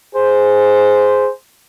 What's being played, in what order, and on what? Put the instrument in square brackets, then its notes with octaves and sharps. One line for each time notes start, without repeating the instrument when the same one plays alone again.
[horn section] G#4 C5